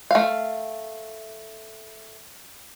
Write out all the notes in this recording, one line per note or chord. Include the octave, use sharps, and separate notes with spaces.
A3 F5